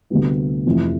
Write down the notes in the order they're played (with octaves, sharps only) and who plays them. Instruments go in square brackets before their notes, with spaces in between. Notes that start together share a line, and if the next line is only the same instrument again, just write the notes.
[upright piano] D2 C3 G3 B3
F1 F2 E3